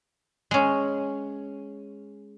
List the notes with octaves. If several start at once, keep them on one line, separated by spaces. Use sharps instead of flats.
G#3 C#4